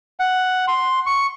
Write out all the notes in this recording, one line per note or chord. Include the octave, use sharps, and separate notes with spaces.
F#5
C6
C#6